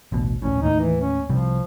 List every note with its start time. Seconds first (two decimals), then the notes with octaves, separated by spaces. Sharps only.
0.12 A1 D2 B2
0.42 D#1 A#1 A2 C#4
0.62 D#2 A2 A#3 D#4
0.80 E3
1.02 C#4
1.30 C2 C3 F3 G3